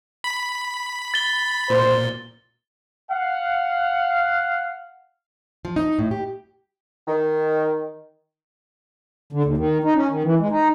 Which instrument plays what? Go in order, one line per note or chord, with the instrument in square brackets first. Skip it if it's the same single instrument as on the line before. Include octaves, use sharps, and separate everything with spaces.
[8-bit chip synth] B5
[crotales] A6 G7
[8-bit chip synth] A#2 [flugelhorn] C5
[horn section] F5 F#5
[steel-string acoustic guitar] F3
D#4
A2
G4
[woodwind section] D#3
[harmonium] D3
D#2
D#3
D#4
C#4
D#3
E3
G#3
D#4